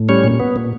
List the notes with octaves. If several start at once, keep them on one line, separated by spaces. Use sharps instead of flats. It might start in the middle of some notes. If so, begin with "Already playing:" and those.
Already playing: A2
G3 C#4 C#5
A#2
B3
A#2